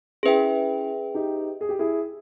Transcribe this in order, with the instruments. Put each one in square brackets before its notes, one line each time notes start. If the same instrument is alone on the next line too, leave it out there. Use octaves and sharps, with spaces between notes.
[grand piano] C#4 E4 [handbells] G#4 B4 E5 G5
[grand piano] D#4 G4
G#4
G4
E4 G#4